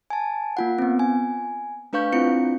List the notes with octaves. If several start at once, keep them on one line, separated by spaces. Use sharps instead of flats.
G#5 A5
A#3 F4 F#5
B3 C4
G#5
A3 D4 B4 F5 C#6 G6
C4 D4 E4 F4 C#7